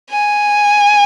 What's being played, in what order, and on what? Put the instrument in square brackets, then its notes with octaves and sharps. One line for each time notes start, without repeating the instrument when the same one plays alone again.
[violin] G#5